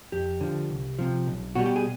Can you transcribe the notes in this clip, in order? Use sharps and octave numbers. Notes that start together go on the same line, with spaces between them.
F2 G4
D3 F3
C2
C3 F3
B1
B2 G3 F#4
G4
G#4